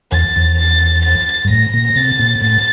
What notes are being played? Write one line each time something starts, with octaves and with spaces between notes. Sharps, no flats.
E2 A6
E2
A6
A6
G2
A2 A#6
A#2
C3 A6
A#2
A2 A6